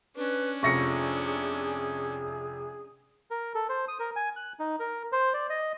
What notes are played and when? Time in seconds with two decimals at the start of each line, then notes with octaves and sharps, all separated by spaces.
0.16 C#4 D4 B4
0.63 F1 C3 F4 G#4 C#6 A#6 C#7
3.31 A#4
3.55 A4
3.69 C5
3.88 D#6
4.00 A#4
4.16 G#5
4.36 F#6
4.60 D#4
4.80 A#4
5.12 C5
5.34 D5
5.50 D#5